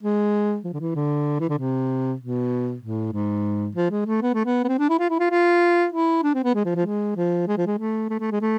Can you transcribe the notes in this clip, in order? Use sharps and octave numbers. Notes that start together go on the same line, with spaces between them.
G#3
F3
D3
E3
D3
E3
D3
C3
B2
A2
G#2
F3
G#3
A3
B3
A3
B3
B3
C4
D4
E4
F4
E4
F4
F4
E4
D4
C4
B3
G#3
F3
F3
G#3
F3
G#3
F3
G#3
A3
A3
A3
G#3
A3